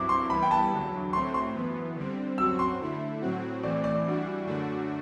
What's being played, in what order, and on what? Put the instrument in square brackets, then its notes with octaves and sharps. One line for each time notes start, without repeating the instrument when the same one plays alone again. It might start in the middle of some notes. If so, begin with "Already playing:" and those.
Already playing: [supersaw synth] G2 F#3 C4 E4 [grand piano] D6
[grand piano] C6
[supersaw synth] E3 G3 B3 E4 [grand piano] B5
[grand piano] G5
A5
[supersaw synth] E2 D3 F#3
[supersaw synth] A2 F#3 A3 C4 [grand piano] C6
[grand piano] C6
[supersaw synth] F#2 E3 B3
D3 G3 C4
[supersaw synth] F#2 F#3 C4 F#4 [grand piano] E6
[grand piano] C6
[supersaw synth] D3 A3 E4
A2 F#3 C4 F#4
[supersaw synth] A2 E3 A3 C4 [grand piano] D5
[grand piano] D5
[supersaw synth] E3 G3 D4 F#4
F#2 D3 A3 D4 F#4